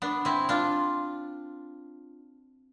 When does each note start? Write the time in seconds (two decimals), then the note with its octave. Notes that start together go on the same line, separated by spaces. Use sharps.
0.02 B3 D4
0.25 C4 E4
0.49 D4 F4